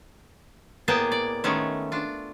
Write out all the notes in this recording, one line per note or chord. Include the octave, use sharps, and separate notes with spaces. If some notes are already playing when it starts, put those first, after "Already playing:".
A2 A#3 B3 G#4 G5 A5
D5
D#3 G#3 A3 B3 C#4
D4 F4